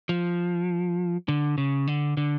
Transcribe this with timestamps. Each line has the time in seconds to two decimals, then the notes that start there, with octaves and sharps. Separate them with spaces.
0.09 F3
1.28 D3
1.58 C#3
1.87 D3
2.17 D3